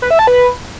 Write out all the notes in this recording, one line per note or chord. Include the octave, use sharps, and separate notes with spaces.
B4
E5
A5
B4